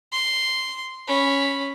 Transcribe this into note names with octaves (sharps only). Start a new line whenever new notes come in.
C6
C#4 B5